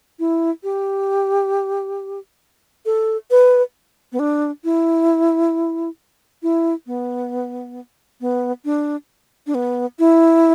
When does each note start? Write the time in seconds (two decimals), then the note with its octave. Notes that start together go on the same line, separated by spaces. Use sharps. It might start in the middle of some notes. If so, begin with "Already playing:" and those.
0.19 E4
0.64 G4
2.86 A4
3.31 B4
4.12 B3
4.19 D4
4.64 E4
6.43 E4
6.87 B3
8.21 B3
8.65 D4
9.47 D4
9.55 B3
9.99 E4